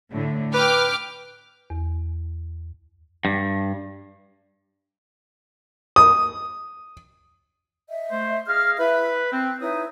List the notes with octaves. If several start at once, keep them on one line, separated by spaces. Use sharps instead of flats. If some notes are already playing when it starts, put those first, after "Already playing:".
A2 D3
B4 G5 D6 F6
E2
G2
D#6
D#5 E5
A3 C5
G#4 D#5 F5 F6
E4 B4 E5
C4 F#6
D#4 E4 B4 C#5 D#6